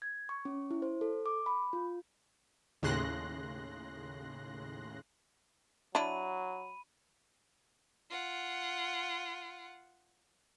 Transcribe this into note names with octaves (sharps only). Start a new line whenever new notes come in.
G#6
C#6
C#4
E4
C5
A4
D6
B5
F4
D#2 A2 C#3 C6 F#6 A#6
F#3 D4 E4 B5 D#7
F4 F#5